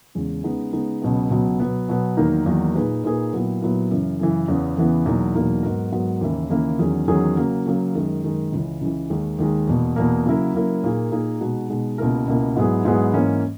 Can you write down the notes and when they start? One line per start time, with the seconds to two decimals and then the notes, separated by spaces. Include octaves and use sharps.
0.15 E2 C#3 G#3
0.44 C#3 G#3 B3 D#4
0.72 C#3 G#3 B3 D#4
1.02 C#2 B2 F#3 B3
1.30 C#2 B2 F#3 B3
1.60 B2 F#3 B3
1.88 B2 F#3 B3
2.17 E2 D#3 F#3 A#3 D#4
2.46 E2 D#3 F#3 A#3 D#4
2.75 A#2 A#3 D#4 G#4 B4
3.04 A#2 A#3 D#4 G#4 B4
3.33 A#2 F#3 B3 E4
3.62 A#2 F#3 B3 E4
3.91 F#2 C#3 E3
4.19 F#2 C#3 E3
4.48 E2 C#3 E3 B3
4.77 E2 C#3 E3 B3
5.06 E2 B2 F#3 A#3 D#4
5.35 E2 B2 F#3 A#3 D#4
5.63 G#2 F#3 B3 F#4 A#4
5.92 G#2 F#3 B3 F#4 A#4
6.21 D#2 C#3 E3 A#3 E4
6.50 D#2 C#3 E3 A#3 E4
6.79 E2 D#3 F#3 C#4 G#4
7.08 E2 D#3 F#3 C#4 G#4
7.37 C#3 F#3 A#3
7.66 C#3 F#3 A#3
7.94 F#2 D#3 G#3
8.23 F#2 D#3 G#3
8.52 C#2 C#3 E3
8.81 C#2 C#3 E3
9.10 D#2 D#3 G#3
9.39 D#2 D#3 G#3
9.67 E2 B2 A#3
9.96 E2 B2 A#3
10.26 C#3 F#3 A#3 E4 A#4
10.54 C#3 F#3 A#3 E4 A#4
10.83 A#2 A#3 D#4 G#4
11.12 A#2 A#3 D#4 G#4
11.41 B2 G#3 D#4 F#4
11.70 B2 G#3 D#4 F#4
11.98 C#2 B2 A#3 E4 A#4
12.28 C#2 B2 A#3 E4 A#4
12.56 G#2 F#3 B3 E4 G#4
12.85 G#2 F#3 B3 E4 G#4
13.14 G#2 E3 A#3 C#4